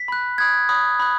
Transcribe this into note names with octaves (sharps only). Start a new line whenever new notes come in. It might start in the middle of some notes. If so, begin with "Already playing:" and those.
Already playing: B6
B5 F#6
B5 D#6 F#6 G#6
B5 D#6 F#6
B5 D#6 F#6